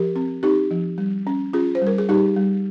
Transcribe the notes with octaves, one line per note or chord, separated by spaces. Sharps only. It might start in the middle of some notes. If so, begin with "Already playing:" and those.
Already playing: F3 G4 A#4
C4
C4 D#4 G4
F3
G3
C#4
C#4 F4 G#4
C5
G3
A#4
G#4
G3 D#4 G4
G3